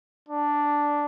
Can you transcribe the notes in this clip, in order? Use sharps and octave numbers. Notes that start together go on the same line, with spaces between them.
D4